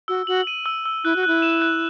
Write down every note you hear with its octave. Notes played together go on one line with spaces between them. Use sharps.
F#4 E6
F#4 F#7
D#7
E6
E6
E4 F#6
F#4
E4 F#6
E7
F#6